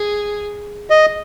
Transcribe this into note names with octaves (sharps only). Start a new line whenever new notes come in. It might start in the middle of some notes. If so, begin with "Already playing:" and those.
Already playing: G#4
D#5